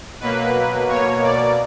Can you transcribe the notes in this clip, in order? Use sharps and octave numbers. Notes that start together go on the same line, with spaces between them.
B2 F#3 A#3 B4
B2 A#3 C#5
D5